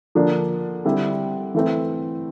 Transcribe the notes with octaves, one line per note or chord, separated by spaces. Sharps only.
D3 F3 A#3 D4
D3 G3 C4 E4
E3 A3 C4